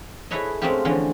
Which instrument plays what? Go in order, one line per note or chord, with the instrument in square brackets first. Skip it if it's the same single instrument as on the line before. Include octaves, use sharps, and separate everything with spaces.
[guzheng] E4 G#4 A4 B4 C#5 D#5
G#3 A3 C4 C#4 F4 G4
D3 E3 F3 C#4